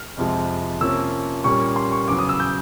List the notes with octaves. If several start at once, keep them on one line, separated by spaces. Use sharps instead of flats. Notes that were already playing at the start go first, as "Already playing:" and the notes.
Already playing: F6
F2 C3 F3 G#3
C3 F3 A#3 C#4 E6
A#2 G3 A#3 C#4 C#6
C6
C#6
E2 C#3 F#3 D6
D#6
E6
G6